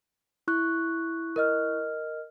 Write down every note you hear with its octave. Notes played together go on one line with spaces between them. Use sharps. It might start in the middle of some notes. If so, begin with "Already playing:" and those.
E4 C#6 F#6
A#4 D#5 F6